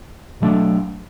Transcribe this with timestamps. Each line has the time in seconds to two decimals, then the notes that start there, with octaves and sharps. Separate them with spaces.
0.40 B2 F#3 A3 D4